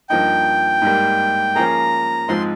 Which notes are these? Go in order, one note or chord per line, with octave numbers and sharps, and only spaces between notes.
G2 F3 A#3 D#4 G5
G#2 G3 A#3
F3 A#3 C#4 G#4 A#5
G#2 F3 G#3 C4 C6